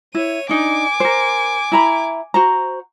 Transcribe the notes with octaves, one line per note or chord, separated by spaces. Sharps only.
E4 C#5 D#7
D4 D#4 G#5 D6
A#4 C5
E4 A#5 B5
F#4 C5 A#5